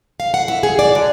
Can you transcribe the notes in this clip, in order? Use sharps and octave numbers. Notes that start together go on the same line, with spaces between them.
F5
F#5
E4
G#4
D5
D3